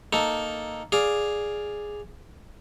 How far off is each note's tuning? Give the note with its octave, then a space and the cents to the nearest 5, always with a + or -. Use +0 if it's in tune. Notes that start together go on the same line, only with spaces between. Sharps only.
A#3 +0 D#4 +0 A4 +0
G#4 +0 D5 +0 F5 +0